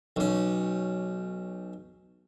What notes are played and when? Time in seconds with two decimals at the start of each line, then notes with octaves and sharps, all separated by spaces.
0.16 B1 C#4